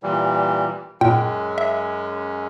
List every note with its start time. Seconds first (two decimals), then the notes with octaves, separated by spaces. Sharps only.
0.03 A#2 E3 G3
1.01 F#2 A#2 G#3 C#4 G5
1.58 E5